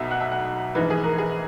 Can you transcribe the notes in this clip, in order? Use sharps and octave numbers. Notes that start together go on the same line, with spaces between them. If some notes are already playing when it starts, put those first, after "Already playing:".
Already playing: B1 B2 F#3 E5
F#5
E5
F#5
A#1 G#2 E3 B4
G#4
A#4
G#4